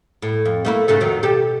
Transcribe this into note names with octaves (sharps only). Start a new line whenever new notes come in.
A2
F2
A3 A#3 E4
G#2 C#3 A3
F2 D#3 F#3
B2 G4 A4